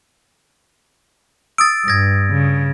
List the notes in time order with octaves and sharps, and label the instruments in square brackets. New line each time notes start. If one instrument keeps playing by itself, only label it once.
[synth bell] D#6 E6 [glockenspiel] A6 D7
[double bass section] G2 [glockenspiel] G#6 A#6
[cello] C#3